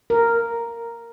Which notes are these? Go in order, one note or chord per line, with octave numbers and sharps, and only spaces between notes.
A#4